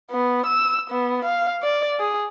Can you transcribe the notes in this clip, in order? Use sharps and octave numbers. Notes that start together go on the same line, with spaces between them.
B3
E6
B3
F5
D5
G#4